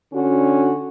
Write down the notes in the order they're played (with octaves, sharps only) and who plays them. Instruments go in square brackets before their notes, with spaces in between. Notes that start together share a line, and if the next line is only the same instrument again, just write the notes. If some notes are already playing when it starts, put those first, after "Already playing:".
[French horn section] D3 C#4 D4 F#4